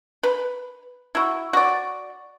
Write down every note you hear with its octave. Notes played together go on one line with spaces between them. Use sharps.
B4
E4 F#4
F#4 D5